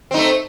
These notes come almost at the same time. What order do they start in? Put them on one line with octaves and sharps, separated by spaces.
C4 D#4 A3